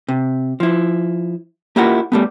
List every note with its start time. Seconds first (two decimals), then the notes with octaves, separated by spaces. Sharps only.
0.08 C3
0.60 F3 E4
1.76 A#3 E4 F4 G4 A#4 F#5
2.12 G3 A3 B3